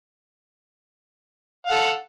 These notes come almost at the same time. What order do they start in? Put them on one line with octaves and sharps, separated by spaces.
F5 F#5 A4